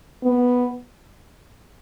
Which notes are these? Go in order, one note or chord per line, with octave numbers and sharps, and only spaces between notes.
B3